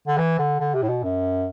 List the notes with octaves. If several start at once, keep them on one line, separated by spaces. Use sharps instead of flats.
D3
E3
D3
D3
C3
A2
B2
F#2